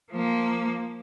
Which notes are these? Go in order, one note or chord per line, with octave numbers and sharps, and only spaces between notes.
F3 A#3